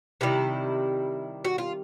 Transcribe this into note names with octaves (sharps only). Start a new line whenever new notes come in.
C3 D#3 G3 E4
F#4
F4